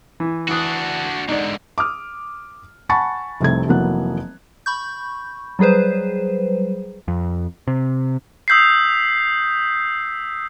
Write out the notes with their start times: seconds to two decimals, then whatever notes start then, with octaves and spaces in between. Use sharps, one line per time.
0.20 E3
0.48 E3 D4 F#4 D#6 F#6
1.29 G#2 D3 D#4 D5
1.78 D6 D#6 F6
2.89 F#5 G#5 A5 B5 C#6 A6
3.40 F1 C2 C3 A3 G#6
3.68 F1 E3 F#3 A#3 B3 F#6
4.66 B5 C#6 G6
5.59 F#3 G3 G#4 B4 C5
7.08 F2
7.67 C3
8.48 D#6 E6 G6 B6 C7